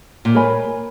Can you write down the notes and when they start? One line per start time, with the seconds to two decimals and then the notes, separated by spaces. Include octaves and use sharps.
0.25 A#2
0.35 A#4 C#5 G#5 B5